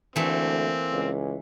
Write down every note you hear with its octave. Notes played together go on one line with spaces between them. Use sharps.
D2 E3 A3 A#3 C4
C#2